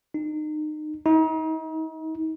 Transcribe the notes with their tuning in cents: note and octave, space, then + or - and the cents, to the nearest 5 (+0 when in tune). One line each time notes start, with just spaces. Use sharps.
D#4 -30
D#4 +40